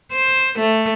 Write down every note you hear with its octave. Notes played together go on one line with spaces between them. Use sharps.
C5
A3